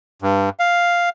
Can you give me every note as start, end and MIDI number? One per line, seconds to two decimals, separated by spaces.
0.22 0.49 43
0.60 1.09 77